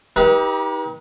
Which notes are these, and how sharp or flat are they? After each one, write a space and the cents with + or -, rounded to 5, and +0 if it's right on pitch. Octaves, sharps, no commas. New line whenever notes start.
D#4 +35 G4 +10 B4 -35